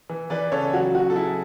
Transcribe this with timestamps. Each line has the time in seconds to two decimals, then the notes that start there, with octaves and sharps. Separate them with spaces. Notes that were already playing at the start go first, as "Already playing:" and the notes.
0.10 E3
0.30 E3 B4 D5
0.52 C#3 A4 C#5
0.73 F#3 F#4
0.95 F#3 F#4
1.10 A4
1.16 F#3 E4 G#4